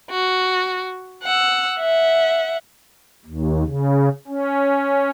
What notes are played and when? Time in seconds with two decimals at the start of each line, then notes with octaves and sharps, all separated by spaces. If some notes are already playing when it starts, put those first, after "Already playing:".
0.10 F#4
1.23 F#5 E6
1.79 E5 F#5
3.25 D#2
3.65 C#3
4.28 C#4